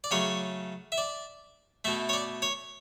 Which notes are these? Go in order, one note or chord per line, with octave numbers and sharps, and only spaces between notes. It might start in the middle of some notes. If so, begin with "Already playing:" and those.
D5
C#3 F#3 A3 C#5
E5
D5
B2 A3 E5
C#5
D5
C#5